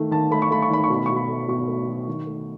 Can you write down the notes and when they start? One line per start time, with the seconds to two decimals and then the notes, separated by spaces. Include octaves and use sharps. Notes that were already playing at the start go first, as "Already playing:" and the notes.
Already playing: D#3 A3
0.11 D#3 A5
0.31 A3 B5
0.42 C#6
0.51 A3 B5
0.62 C#6
0.70 D#3 B5
0.84 C#6
0.90 B2 B5
1.06 B2 C#6
1.16 B5
1.29 A3
1.48 B2 C#6
1.68 A3
1.88 F#3
2.07 D#3
2.27 A3